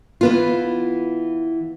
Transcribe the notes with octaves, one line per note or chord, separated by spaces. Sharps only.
E3 B3 F4